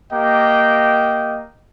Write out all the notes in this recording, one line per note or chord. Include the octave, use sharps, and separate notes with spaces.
A#3 G4 D#5 G5